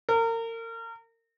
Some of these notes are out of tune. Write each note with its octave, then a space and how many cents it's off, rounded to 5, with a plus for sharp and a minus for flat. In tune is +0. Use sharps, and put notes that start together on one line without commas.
A#4 -30